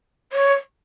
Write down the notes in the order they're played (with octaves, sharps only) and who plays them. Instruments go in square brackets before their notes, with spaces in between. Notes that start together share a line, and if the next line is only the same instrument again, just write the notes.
[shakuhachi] C#5